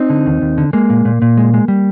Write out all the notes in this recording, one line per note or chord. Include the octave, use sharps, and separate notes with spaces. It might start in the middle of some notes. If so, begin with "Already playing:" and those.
Already playing: C4 D#4
D3
D#2
D#2
D3
G#3 A#3
A#2
A#2
A#2
G#3
G#3
G3